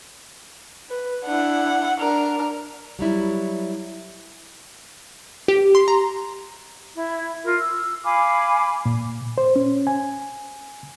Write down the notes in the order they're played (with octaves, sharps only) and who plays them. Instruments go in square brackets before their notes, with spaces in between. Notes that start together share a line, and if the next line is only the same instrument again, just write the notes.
[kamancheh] B4
[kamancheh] D4 E4 [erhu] F#5
[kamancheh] D4 [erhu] A#4
[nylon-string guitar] F#3 G3 E4
[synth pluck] G4
C6
A#5
[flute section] E4
F4 A#4
E6
F5 G#5 B5 D6
[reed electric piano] A#2
C5
C#4
G#5